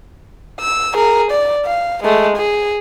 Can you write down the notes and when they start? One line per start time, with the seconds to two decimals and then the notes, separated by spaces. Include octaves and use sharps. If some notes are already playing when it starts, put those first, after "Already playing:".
0.60 E6
0.93 G#4 A#4
1.31 D5
1.66 F5
2.03 G#3 A3
2.36 G#4